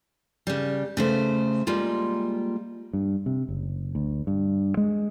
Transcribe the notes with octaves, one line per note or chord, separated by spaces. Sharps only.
C#3 G3
C#3 A3 C5
G3 G#3 A#3 F4
G2
C3
F#1
D2
G2
G#3